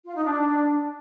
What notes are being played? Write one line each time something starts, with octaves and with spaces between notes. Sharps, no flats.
F4
D#4
D4